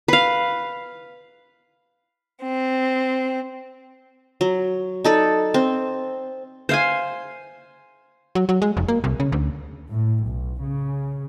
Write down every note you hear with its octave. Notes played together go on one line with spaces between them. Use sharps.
B4 F5
C4
F#3
D#4 A4 D5
C4
C5 F5 G#5
F#3
F#3
G#3
F1
A#3
C2
C#3
D2
A2
B1
C#3